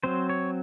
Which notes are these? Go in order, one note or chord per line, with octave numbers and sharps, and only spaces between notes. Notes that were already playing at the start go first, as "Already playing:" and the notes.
F#3 C4 C5
C#5